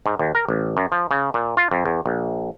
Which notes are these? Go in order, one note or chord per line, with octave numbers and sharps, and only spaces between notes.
G#2
D#2
A#4
A1
F#2
F3
C#3
A#2
F4
F2
E2
A#1